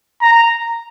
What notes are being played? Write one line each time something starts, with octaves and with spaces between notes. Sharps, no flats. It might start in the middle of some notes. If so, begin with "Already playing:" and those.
A#5